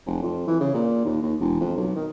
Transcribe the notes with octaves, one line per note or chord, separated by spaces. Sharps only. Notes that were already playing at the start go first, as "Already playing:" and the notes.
F1
F2
E3
C#3
A#2
D#2
D#2
E1
F2
B1
D#3